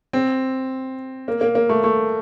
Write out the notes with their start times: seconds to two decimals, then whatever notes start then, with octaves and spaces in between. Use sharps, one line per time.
0.13 C4
1.28 A#3
1.41 A#3
1.55 A#3
1.69 A3
1.84 A3